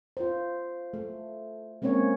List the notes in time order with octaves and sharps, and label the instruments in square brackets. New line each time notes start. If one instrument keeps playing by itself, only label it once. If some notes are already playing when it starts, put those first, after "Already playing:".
[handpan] F4 C5
A3
G#3 A#3 C4 C#4 C#5